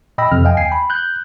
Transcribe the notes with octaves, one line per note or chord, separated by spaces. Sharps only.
A#2 D#5 G5 B5 E6 A#6
F2 C3 F6
D#5 F5 G5 G#5
D#2 G5 G#5 C7
B5
F#6 G6